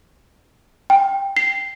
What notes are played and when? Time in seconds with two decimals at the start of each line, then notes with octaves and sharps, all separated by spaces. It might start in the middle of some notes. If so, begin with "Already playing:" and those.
0.90 G5
1.37 C7